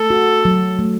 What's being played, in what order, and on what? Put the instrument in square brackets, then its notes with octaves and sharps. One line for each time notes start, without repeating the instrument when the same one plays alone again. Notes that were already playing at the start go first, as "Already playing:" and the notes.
Already playing: [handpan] A3 [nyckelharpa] A4
[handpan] F#4
F#3
A3